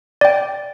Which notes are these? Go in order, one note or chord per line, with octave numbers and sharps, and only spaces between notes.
D5 G5